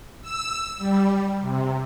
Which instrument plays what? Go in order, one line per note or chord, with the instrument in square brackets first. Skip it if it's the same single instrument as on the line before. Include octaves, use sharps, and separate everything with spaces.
[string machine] E6
G3
C3